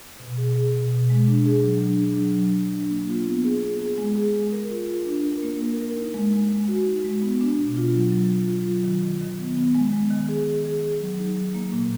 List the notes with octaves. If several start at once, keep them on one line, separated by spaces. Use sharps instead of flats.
B2
G#4
G#4
B2
B2
G#3
D4
G#4
F#3
D4
D4
F#3
F#3
F#3
D4
A#3
F4
B3
G#4
G#4
G#4
G#3
G#4
G#3
A#4
F4
F4
D4
A#4
A#3
A#4
A#4
D#4
G#3
G#3
G#3
F#4
D#4
G#3
B3
D4
B2
F4
F#3
F#3
F4
F4
F#3
D#3
D#3
D#3
B3
B3
G#3
G#3
D#3
G#4
G#4
G#4
G#4
F#3
D#4
F#3
A#3
A#2